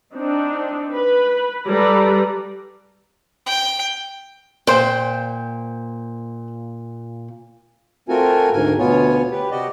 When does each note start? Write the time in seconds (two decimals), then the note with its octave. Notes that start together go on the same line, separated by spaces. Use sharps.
0.14 C4 D4 D#4
0.93 B4 B5
1.66 G3 A4 B4 D5 A#5
3.46 G5
4.67 A#2 C5 G5
8.09 A3 C4 F4 F#4 A#4 G#5
8.52 D2 G#2 A#4 G#5
8.79 D2 B2 B3 F4 C#5 G#5
9.31 G4 B4
9.51 C3 F#4 G4 D5 D#5